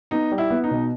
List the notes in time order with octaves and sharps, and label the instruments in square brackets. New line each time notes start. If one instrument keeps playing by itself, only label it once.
[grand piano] B3 [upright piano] D#4
[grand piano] G3
[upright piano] E4
[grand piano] B3
[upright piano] D#4
[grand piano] B2